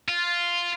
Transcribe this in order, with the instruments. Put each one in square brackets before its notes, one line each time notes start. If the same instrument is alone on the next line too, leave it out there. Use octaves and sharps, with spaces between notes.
[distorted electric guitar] F4